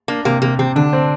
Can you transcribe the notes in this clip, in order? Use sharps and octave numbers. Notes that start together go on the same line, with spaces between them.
A#3 D4
C3 A#3
C3 A#3
C3 C4
D3 D4
C4